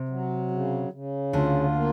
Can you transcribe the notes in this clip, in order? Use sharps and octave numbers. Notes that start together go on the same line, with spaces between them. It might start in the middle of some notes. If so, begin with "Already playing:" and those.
Already playing: C3
F#3
C#3
C#3
D2 D3 F4
A#3